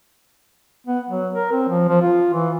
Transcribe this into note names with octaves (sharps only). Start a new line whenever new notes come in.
B3
F#3
A#4
C4
F3
F3
F4
E3